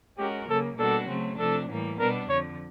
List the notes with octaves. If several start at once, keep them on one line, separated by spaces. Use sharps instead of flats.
G#3 C#4 F#4 G4 A#4
C#3 F#3 A#3 A4
B2 G3 A#3 D4 F#4 A4
C#3 F#3 A3 C4
C3 F3 A3 D4 A4
A2 E3 G3 A#3
B2 G3 B3 D4 A#4
F2 D3 F3 C#5